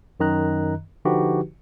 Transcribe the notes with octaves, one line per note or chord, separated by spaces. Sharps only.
F#2 D#3 D#5 A#5 F#6
D3 F3 D#4 F#4 G4 B4